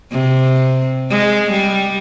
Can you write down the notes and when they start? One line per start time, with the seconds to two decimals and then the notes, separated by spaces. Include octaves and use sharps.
0.12 C3
1.11 G#3
1.51 G3